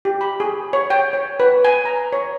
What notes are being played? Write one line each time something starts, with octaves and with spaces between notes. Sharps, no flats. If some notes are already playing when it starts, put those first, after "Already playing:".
G4
B5
G#4
C#5
G5
C#5
B4
G#5
A#5
C#5